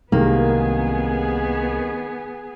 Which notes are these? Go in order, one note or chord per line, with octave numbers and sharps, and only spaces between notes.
C2 C3 D#3 G#3 A#3 B3 G#4